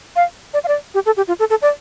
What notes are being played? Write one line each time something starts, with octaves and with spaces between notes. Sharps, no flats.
F5
D5
F5
D5
G4
A4
G4
F4
A4
A4
D5